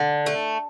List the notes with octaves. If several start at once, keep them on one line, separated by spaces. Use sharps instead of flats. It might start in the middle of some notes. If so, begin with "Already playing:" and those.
Already playing: D3
A3